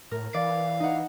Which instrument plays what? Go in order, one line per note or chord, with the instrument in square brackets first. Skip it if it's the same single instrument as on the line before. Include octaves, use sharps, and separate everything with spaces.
[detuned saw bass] A2 [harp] A#4
[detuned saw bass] E3 [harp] D5 [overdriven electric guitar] F5
[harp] D#4 F#5